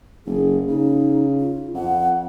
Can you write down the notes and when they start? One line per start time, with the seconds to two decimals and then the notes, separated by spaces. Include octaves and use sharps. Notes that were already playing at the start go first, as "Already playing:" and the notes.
0.26 F#1 G#4
0.68 C#3 D#4
1.38 F4
1.74 F2 F#5